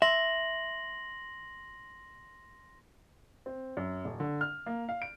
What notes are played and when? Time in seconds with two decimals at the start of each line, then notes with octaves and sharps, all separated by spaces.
0.02 E5 C6 A#6 F#7
3.46 C4
3.77 F#2
4.05 D#1
4.20 D3
4.41 F6
4.66 A#3
4.89 F5
5.02 D7